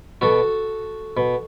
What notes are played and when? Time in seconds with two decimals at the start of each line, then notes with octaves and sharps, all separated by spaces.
0.21 B2 F#4 A4
1.17 B2